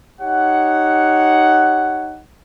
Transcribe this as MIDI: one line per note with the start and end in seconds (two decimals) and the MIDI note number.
0.21 2.20 63
0.21 2.20 67
0.21 2.20 73
0.21 2.20 78